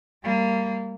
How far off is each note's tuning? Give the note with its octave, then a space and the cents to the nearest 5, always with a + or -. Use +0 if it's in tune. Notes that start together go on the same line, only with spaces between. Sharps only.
G3 +0 A#3 -25